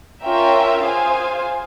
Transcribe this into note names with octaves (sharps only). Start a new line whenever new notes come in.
C#4 F4 A#4 E5 G5
F4 G#4 C5 F5 G#5